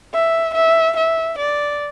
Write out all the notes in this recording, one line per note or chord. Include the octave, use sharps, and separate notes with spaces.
E5
E5
E5
D5